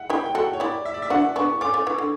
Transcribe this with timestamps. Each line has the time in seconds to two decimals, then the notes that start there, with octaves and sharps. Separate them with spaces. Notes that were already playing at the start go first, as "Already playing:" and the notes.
Already playing: E5 F#5
0.10 E4 G4 G5
0.26 G5
0.35 F#4 A4 F#5
0.53 C#5
0.60 E4 G4 D5
0.85 E5
0.94 D5
1.02 E5
1.10 D4 F#4 F#5
1.36 B3 D4 C#6
1.61 A3 C#4 D6
1.74 A3 C#4
1.86 E3 C#6
1.98 D3